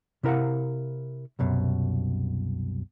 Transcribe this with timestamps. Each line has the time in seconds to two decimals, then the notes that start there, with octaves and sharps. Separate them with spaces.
0.23 C3 E4 A#4 F5 F#5
1.39 C2 F#2 B2